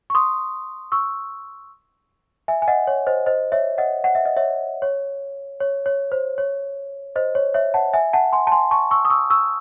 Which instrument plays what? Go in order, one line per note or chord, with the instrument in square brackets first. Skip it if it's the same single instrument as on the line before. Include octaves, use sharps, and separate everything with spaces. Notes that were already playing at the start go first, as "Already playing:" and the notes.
[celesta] C#6
C6 D#6
C#6 E6
E5 G#5
G#5
D#5 F#5
C#5
C5 D#5
C5 D#5
C#5 E5
D#5 F#5
F#5
E5
D#5
C#5 E5
C#5
C#5
C#5
C5
C#5
C5 D#5
C#5
C#5 E5
F#5 A5
E5 G#5
F#5 A5
G#5 C6
A5
G#5 C6
A5 C#6
C#6 E6
D#6
C#6 E6
C#6 E6